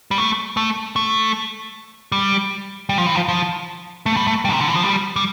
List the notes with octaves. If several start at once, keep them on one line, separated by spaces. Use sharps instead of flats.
G3
A3
A3
A3
G3
G3
F3
E3
F3
F3
A3
G3
A3
G3
C3
D3
E3
F3
G3
G3